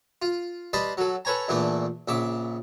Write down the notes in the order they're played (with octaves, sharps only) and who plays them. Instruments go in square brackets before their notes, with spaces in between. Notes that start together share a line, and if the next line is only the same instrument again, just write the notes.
[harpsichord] F4
G3 B4 D#5 A5 C6 D#6
F#3 A4
A4 B4 C#5 G#5 A#5
E2 A#2 E3 A3 D4
A#1 C#3 E5 D6